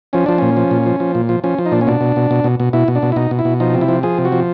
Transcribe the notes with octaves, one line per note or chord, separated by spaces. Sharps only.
F3 C#4
F3 D4
A#2 C#4
F3
A#2
F3
F3
A#2
F3
F3 C#4
F3
D#4
A#2 D4
C#4
B2 D4
B2
B2
B2
B2
B2
B2 E4
B2
D4
B2
E4
B2 D#4
B2
E4
B2
F3 D#4
C3
E4
F3
F3 G#4
C3
F#4
F3